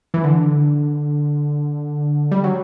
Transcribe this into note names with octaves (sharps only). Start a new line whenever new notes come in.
E3
D3
G3
F#3